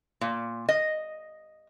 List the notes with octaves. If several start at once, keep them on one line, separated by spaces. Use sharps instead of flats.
A#2
D#5